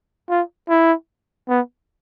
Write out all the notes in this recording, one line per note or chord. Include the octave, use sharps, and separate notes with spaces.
F4
E4
B3